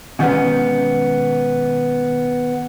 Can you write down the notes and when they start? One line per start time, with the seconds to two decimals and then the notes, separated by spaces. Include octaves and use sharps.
0.19 B2 D#3 G3 G#3 B3 C#4